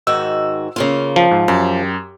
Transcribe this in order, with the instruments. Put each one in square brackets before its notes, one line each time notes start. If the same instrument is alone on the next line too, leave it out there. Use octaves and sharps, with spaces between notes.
[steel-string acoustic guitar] G#2 D#3 F#4 [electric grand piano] E6
[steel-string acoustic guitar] C#3 A#3 F4
[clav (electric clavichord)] F3
[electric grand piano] G#2
[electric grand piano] F#2 [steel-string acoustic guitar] G4